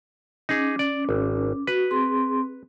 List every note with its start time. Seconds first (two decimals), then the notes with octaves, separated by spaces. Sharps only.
0.49 C#4 D#4 G#4 D6
0.79 D5
1.09 G#1
1.67 F#4 B4
1.91 C4 G#4 C6